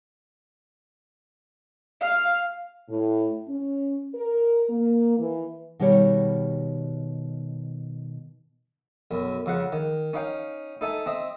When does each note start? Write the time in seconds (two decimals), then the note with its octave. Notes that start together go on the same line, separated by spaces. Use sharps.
2.01 F5
2.89 A2
3.48 C#4
4.15 A#4
4.70 A#3
5.18 E3
5.79 B2 D#3 G3 G4 C#5
9.11 B1 F#2
9.46 F2 C#3 F5 F#5
9.72 D#3
10.13 C#4 D#4 F5 G5
10.81 D#4 A4 E5 G#5
11.06 C4 D#5 E5